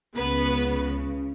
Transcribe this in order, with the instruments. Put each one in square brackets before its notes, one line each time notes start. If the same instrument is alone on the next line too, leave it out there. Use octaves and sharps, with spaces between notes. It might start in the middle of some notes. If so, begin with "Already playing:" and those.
[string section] C#2 C#3 B3 B4